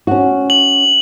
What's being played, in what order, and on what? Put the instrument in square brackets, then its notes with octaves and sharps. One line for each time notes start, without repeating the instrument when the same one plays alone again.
[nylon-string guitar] C#4 F#4
[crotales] F#7